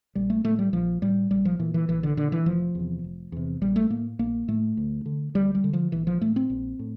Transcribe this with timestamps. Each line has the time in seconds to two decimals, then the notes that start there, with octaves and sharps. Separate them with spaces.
0.15 A#1 G3
0.30 A3
0.44 A2 A3
0.59 G3
0.73 A#1 F3
1.02 A2 G3
1.31 A#1 G3
1.45 F3
1.59 A#2 E3
1.74 E3
1.88 A#1 E3
2.03 D3
2.17 A#2 D3
2.32 E3
2.46 F1 F3
2.75 E2 C3
3.04 F1
3.32 E2 C3
3.61 A#1 G3
3.76 A3
3.90 A2 A#3
4.19 A#1 A#3
4.48 A2 A3
4.77 D2
5.06 D3
5.34 D2 G3
5.55 G3
5.64 D3
5.73 F3
5.92 A#1 E3
6.07 F3
6.21 A2 A3
6.36 C4
6.50 A#1
6.79 A2